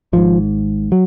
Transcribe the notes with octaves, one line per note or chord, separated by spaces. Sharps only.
G#1 G#2 F3
F#3